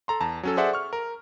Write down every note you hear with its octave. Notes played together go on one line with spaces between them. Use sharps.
A4 A#5 C6
E2 A5 A#5
F#3 C#4 A4
G#4 A4 C5 D5 E5 F#5
C#6 F6
A#4